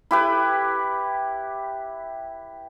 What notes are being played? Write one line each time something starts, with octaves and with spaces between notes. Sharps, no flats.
E4 G4 B4